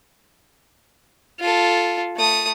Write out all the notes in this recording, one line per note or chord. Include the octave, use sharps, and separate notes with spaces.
F4 A4
A3 D#6